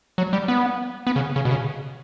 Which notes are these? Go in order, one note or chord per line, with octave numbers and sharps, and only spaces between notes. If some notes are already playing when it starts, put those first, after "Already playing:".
F#3
G3
B3
B3
C#3
C#3
B2
C#3